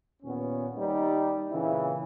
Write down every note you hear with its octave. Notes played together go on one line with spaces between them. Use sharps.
D#2 A#2 B3 C#4
D#2 G3 D#4
A#2 C#3 E3 C4 E4